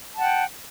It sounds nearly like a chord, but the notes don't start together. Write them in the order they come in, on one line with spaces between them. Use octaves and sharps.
A5 F#5 G5